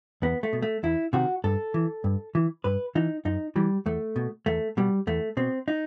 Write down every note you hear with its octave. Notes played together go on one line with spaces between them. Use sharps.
E2 B3
A3
B2
A3
E2 E4
C3 D#3 F#4
G2 A4
E3
G2
E3
G2 B4
E3 D#4
F#2 D#4
E3 G3
E2 A3
B2
E2 A3
B2 G3
E2 A3
B2 C4
D#4